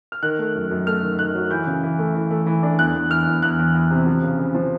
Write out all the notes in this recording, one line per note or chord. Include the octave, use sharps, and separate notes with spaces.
F6
D#3 F#6
A3
F#2
F#2
A3 F6
D#3
D#3 F#6
F#3
E3 G6
C#3
E3
A3
E3
A3
E3
D4
E2 F#6
E2
E3 F6
E2
E2 F#6
E2
E2
C3
F3
C#3
C#3
F3